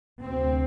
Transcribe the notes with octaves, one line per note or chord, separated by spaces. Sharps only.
D2 C3 C4